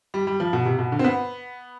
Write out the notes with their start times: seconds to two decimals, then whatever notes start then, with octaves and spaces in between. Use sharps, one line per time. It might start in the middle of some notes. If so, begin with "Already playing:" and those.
0.14 G3
0.27 G3
0.40 F3
0.53 B2
0.65 C3
0.79 B2
0.92 D3
0.99 C4
1.04 B3